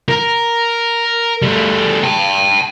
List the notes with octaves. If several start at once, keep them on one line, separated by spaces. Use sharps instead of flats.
A#4
G3 A3
G5 A5